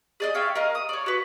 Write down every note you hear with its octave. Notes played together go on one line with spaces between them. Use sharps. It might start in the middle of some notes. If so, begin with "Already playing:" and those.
G#4 D5 D#5
C#5 E5 F5 G5
A#4 D#5 F5
D#6
C#5 D5
F#4 B4